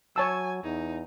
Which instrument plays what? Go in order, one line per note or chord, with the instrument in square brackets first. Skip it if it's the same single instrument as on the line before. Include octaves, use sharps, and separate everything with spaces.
[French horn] F#3 [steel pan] C#5 A5 E6 [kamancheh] G#5
[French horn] E2 [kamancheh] D#4